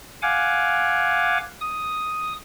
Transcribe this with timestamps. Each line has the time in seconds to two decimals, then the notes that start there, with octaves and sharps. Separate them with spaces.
0.22 F5 F#5 G#5 D6
1.61 D#6